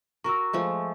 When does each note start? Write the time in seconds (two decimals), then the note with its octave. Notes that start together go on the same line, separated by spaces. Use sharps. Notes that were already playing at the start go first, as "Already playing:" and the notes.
0.24 F#4 A#4 C#6 E6
0.53 F3 G#3 A3